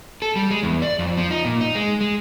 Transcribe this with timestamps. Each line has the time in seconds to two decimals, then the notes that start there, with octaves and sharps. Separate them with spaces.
0.22 A4
0.36 G3
0.51 G#3
0.63 E2
0.82 D5
0.99 F2
1.17 F3
1.31 D#4
1.45 A#2
1.61 D#4
1.75 G#3
2.01 G#3